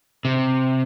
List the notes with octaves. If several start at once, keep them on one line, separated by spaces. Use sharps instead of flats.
C3